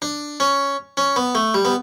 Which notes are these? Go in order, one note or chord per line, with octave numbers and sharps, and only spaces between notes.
D4
C#4
C#4
B3
A3
G3
B3